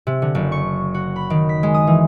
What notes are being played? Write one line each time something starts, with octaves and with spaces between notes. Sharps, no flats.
C3
D3
F#1
C#6
F#4
B5
D#3
B6
G#3
D#6
E3